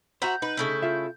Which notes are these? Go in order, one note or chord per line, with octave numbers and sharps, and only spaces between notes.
F#4 C5 E5 F#5 A#5 G6
D#4 B4
C#3 A3 E4
F4 E5